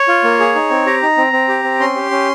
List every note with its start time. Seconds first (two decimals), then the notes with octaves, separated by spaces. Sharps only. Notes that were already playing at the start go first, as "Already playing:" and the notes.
Already playing: C#5
0.08 F4
0.24 A#3
0.40 G#4
0.55 D#4
0.70 C4
0.86 G4 A#5
1.02 D#4
1.17 C4
1.33 C4
1.48 G4
1.64 C4
1.80 C#4 C6
1.95 G4
2.11 C#4